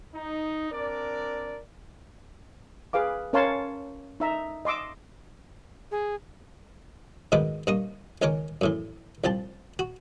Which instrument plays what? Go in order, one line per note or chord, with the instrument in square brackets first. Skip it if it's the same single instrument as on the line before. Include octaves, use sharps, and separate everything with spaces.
[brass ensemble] D#4
C4 D4 A#4 D5
[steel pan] G#4 B4 F5 D6
C#4 A#4 C#5 F5 A5 C6
D#4 E5 A#5
D#5 C6 D6 E6
[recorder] G#4
[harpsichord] G#2 B2 D#3 B4 D#5 D6
G2 A#3 D#5 C#6 D#6
C#2 D#3 C#4 A#4 C#5 D6
F#2 A2 E3
C2 F3 G4 A5
F#4